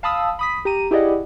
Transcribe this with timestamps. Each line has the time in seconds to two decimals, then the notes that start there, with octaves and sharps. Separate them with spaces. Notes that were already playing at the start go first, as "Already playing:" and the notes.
0.03 F5 A5 B5 D#6 E6
0.39 B5 D#6 B6
0.65 G4 A#5 D#7
0.91 E4 G4 G#4 D5 D#5 F#5